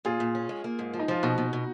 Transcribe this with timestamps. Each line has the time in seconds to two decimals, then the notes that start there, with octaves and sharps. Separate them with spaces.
0.05 A#2 F4 G#4
0.20 A#2
0.35 C#4
0.49 G#3
0.64 A#3
0.79 G#2
0.93 F3
0.99 D#4
1.08 F3 F4
1.23 B2 D#4 F#4
1.38 B2
1.53 B2